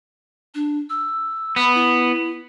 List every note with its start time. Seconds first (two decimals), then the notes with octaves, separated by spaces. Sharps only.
0.55 D4
0.90 E6
1.56 B3 B5
1.75 E4